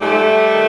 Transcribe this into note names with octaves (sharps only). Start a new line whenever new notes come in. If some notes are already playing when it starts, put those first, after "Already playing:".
G#2 F3 G3 A3
D#3